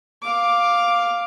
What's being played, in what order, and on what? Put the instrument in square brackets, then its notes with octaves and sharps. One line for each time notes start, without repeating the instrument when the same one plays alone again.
[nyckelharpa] F5 D6